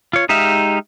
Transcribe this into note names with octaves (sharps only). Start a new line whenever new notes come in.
F4 C#5
G#3 D#4 G4 E5 F5